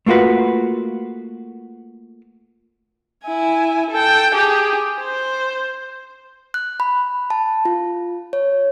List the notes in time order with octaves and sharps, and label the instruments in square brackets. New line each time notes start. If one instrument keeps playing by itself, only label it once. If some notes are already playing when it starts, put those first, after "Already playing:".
[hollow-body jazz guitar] A3 A#3 F4 F#4 B4
[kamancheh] E4 G#5
A4 G5
G4 G#4
C5
[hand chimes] F#6
B5
A5
F4
C#5